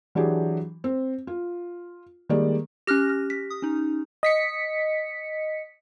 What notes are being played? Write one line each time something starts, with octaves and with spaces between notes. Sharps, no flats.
E3 F#3 D4 G4 G#4
C4
F4
D#3 G3 G#3 A#3 D5
C#4 G4 F6 F#6 A#6
F6
B6
D#6
C#4 D#4
D#5 B6 C#7